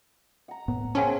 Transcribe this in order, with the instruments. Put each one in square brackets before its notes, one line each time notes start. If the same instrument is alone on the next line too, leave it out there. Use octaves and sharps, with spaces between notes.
[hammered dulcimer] F#5 A#5
[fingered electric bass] A2 B3
[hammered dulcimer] C#3 C4 [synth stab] C#4 [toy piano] F#5 G#5 A5